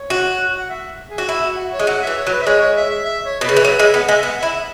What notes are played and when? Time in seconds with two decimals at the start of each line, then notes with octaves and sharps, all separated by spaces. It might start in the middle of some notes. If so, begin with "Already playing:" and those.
Already playing: C#5
0.10 F#4
0.59 F#5
0.69 E5
1.09 G#4
1.18 F#4
1.29 E4 F#4
1.43 F#4
1.58 F#4
1.73 C#5
1.79 G#3
1.87 F#3 F#5
2.02 E5
2.07 E3
2.17 C#5
2.27 F#3
2.32 B4
2.42 E5
2.46 G#3 C#5
2.61 C#5
2.76 E5
2.90 E5
3.05 E5
3.25 C#5
3.41 B2
3.45 C#3 B4
3.57 E3
3.65 F#3 B4
3.79 G#3 E5
3.94 B3 F#5
4.08 G#3 E5
4.23 B3 F#5
4.38 E4 E5